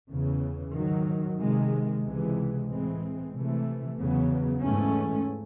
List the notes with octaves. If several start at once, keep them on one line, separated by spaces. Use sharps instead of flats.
E2 C#3 E3
G#2 D#3 F#3
C3 D#3 G#3
C#2 C3 E3 G#3
A2 E3 G#3 C4
C3 E3 A3
E2 C#3 F#3 B3
G#2 E3 A3 C#4